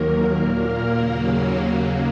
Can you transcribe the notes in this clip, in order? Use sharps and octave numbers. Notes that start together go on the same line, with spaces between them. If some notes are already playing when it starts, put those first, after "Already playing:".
Already playing: D#2 D#3 F#3 A#3 A#4
A#2 A#3 A#4
D#2 C#3 F#3 A#3